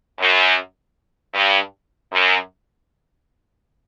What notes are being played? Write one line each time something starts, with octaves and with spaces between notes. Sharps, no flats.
F#2
G2
F#2